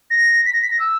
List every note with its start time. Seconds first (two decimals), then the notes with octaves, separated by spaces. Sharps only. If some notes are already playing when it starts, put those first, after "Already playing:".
0.11 A#6
0.45 B6
0.53 A#6
0.63 B6
0.71 A#6
0.79 E6